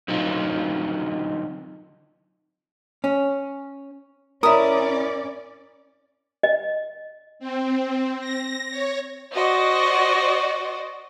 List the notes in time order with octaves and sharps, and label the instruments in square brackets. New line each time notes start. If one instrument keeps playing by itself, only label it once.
[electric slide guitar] D3 F#3 C4 D#4 F4
[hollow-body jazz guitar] C#4
[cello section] C#4 D5 [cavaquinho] E4 D#6 [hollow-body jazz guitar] A#4
[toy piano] D#5
[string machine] C4
A#6
C#5
[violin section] F#4 C5 D5 D#5